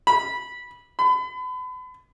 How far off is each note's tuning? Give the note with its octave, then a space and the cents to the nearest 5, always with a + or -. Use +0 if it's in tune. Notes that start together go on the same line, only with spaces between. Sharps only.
B5 -15
B5 +35